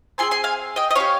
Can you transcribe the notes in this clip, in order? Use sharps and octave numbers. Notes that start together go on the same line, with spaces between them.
C4 F4 G#4 G#5 C6
G#5 C6
F5 G#5
D#5 G5
D#5
C#4 G4 C#5 F5